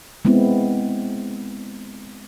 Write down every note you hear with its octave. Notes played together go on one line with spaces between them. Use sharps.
G#3 B3 C4 E4